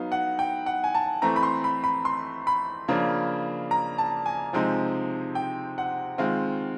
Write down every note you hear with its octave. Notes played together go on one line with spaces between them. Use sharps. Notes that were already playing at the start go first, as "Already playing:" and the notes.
Already playing: F#3 B3 D#4 F5
F#5
G5
F#5
G#5
A5
E3 A3 C4 A#5
B5
C6
B5
B5
C6
B5
C#3 F3 A#3 D4
A#5
A5
G#5
C3 F3 G#3 C4 D#4
G5
F#5
D#3 G#3 C4 F4